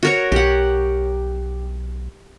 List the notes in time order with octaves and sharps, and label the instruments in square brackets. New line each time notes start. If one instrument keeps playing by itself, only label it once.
[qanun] F#4 A#4 C#5
[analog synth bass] B1 [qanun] G4 F#5